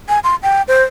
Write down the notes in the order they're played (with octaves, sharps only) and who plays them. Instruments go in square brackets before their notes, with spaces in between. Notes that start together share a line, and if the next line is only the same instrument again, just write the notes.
[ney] G#5
C6
G5
C5